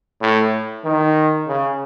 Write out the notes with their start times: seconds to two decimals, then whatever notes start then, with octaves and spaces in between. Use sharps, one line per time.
0.21 A2
0.84 D#3
1.48 C#3